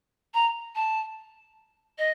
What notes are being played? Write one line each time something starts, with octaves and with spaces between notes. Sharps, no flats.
A#5
A5
D#5